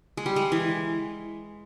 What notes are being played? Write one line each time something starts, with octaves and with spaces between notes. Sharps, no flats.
G#3
G3
G#3
E3